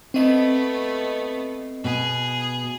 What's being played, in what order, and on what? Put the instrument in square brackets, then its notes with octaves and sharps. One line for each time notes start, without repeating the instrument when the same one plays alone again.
[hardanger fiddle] A3 B3 [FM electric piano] C4 D#5
[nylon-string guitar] B2 [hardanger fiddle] G#4